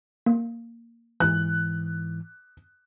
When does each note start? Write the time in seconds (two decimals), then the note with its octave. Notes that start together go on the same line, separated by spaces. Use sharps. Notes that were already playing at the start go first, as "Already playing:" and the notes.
0.26 A#3
1.20 G#2 E3 F#6